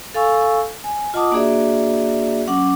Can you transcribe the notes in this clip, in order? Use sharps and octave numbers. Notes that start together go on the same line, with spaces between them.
A4 F5 G#5 C#6 E6
G#5
F4 D#5 F#5 A5 D6 D#6
A#3 D4 F#4 G#4 D5 E5
F#3 C#4 F#5 D6